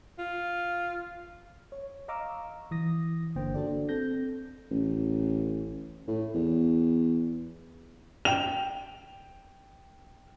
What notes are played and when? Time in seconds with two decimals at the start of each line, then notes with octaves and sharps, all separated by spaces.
0.19 F4
1.72 C#5
2.08 D#5 F5 A#5 C#6 D6 E6
2.71 E3 D#6 A#6
3.36 G1 D3 A#3 C5 G5
3.54 D4 F#4 A4 D5
3.89 C4 A4 G6 A#6
4.71 A1
6.08 A2
6.34 E2
8.25 G5 F7